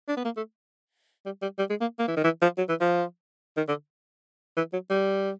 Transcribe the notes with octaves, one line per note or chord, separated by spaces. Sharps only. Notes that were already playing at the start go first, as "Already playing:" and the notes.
D4
B3
A#3
A3
G3
G3
G3
G#3
A#3
A#3
E3
D#3
E3
F3
F#3
E3
F3
D#3
D3
E3
F#3
G3